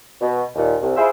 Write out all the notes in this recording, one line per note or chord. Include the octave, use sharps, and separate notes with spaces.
B2
D#2 A#2
C2
E4 F4 G#4 C5 E5